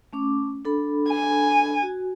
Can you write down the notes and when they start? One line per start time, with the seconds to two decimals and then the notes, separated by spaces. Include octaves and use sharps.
0.13 A3 C#4 D6
0.65 D4 A4 B5
1.08 G#5
1.83 F#4